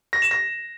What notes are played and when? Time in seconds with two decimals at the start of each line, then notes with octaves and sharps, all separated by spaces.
0.13 A#6
0.22 E7
0.31 A#6